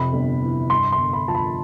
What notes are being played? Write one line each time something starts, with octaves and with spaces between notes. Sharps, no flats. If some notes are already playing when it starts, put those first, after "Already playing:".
Already playing: F2 C3 B5
G1
E3
G2 C6
C6
G1
B5
F3 A5
B5